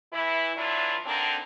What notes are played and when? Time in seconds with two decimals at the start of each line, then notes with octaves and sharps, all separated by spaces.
0.13 E3 E4
0.56 E3 F#3 D4 E4 F4
1.06 D3 A#3 C4 D4 D#4